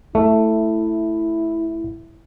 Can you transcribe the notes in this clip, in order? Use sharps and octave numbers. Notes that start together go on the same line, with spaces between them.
A3 E4